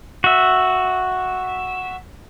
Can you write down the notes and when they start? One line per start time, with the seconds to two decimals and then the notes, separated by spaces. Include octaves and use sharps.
0.24 F#4 E5